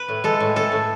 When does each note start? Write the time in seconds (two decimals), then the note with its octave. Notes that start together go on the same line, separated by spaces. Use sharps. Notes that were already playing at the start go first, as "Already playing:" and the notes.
Already playing: B4
0.08 A2
0.24 G#3 A4
0.40 A2
0.56 A2 A4
0.72 A2